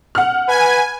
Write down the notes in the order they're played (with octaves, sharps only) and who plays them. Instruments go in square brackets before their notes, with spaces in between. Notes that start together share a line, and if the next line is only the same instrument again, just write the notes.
[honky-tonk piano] F#5 F6
[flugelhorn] B4 [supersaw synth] G#5